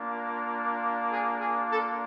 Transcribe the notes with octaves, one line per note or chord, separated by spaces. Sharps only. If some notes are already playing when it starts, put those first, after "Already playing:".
Already playing: A#3 D4 F4
G#4
G#4
A4